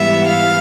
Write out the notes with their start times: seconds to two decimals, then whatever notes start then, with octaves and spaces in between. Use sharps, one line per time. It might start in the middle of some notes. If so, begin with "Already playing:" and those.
Already playing: G#2 E3 G3 B3 E5
0.27 F5